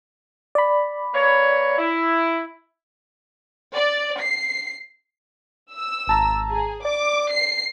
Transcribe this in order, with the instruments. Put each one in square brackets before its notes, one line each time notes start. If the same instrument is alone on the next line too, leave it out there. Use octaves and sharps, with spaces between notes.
[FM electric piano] D5 B5
[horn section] A#3 B4 C#5
E4
[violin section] D5
C7
[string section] E6
[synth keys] G#1 A5 A#5
[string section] G#4
[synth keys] D5 [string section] D6
[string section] C7